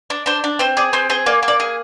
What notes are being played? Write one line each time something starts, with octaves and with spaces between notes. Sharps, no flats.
D4
D4 C5
D4
C4 C5
G#4 D5
C4 C5
G#4 C5
A#3 D5
A#3
D5
G#4